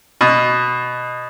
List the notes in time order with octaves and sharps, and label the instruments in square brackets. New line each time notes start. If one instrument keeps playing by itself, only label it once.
[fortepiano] B2